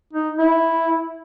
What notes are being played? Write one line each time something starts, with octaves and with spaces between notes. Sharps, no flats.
D#4
E4